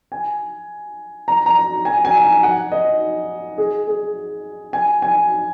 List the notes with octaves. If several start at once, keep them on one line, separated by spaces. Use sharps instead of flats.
G#5
A#5
A#5
G#5
G#5
G#5
F#5
D#5
G#4
G#4
G#5
G#5